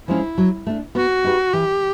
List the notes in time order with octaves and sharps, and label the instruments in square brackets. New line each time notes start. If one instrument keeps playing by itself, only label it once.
[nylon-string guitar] F3 G#3 C#4 [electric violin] E4
[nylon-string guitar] F#3
A3 D4
[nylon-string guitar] B3 [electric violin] F#4
[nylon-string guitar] D#4 G4 B4
[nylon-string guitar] E3 [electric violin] G4